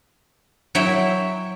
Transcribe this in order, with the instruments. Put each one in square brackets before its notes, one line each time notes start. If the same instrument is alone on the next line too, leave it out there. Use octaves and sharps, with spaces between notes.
[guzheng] F#3 E4 E5 G5